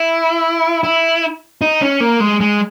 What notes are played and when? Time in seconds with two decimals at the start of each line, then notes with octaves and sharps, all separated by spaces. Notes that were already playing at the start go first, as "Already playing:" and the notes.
Already playing: E4
0.83 E4
1.61 D#4
1.82 C#4
2.00 A#3
2.20 G#3
2.40 G#3